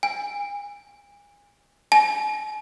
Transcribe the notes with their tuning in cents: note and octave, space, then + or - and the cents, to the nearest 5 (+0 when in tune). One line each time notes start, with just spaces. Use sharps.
G#5 -30
G#5 +45